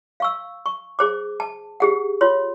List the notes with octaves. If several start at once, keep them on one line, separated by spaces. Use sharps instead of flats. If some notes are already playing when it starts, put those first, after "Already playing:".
F5 C#6 E6
C#6
G#4 C5 D6
A5
G4 G#4 F#5
F4 C#5 C6